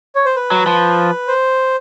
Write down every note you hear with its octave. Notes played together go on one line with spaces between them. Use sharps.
C#5
C5
B4
F#3
F3
C5